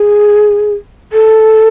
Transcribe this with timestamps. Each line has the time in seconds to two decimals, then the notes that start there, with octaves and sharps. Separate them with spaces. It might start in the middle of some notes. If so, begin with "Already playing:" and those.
Already playing: G#4
1.12 A4